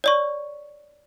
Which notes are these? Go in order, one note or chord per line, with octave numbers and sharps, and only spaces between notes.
C#5 D5 C#6